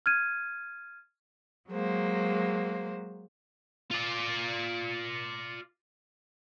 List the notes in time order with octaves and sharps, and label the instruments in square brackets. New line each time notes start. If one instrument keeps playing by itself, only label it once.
[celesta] F6 G#6 D#7
[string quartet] F#3 G#3 A#3 C5
[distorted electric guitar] F4 D5